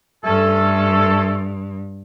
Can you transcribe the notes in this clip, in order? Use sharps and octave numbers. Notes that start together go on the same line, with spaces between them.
G2 A3 C#4 A4